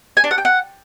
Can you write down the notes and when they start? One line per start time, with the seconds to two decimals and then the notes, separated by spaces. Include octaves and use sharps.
0.17 G#5
0.24 D4
0.31 F#5
0.38 G5
0.45 F#5